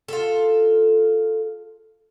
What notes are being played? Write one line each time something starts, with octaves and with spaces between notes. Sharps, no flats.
F4 A4